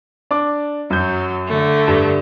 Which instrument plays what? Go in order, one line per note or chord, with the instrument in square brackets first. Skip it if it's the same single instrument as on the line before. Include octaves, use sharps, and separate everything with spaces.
[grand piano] D4 D6
[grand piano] F#2 G6 [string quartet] F#3
[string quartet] D3 A3
[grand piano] G2